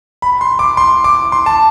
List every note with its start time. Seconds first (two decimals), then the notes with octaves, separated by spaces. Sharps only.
0.22 B5
0.41 C6
0.59 D6
0.77 C6
1.04 D6
1.32 C6
1.46 A5